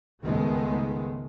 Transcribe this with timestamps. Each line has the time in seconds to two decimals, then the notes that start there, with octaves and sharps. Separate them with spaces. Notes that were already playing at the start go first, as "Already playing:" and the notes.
0.23 C#2 G#2 D#3 G#3 A3 B3